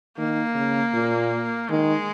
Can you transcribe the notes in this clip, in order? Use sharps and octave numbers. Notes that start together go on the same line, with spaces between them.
D#3 A#3
C#3
A#2
D#3 G#3